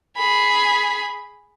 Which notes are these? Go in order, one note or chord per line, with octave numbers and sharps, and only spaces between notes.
G#4 B5